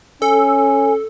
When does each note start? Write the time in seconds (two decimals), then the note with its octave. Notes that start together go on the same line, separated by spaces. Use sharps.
0.22 C#4 A4 G#5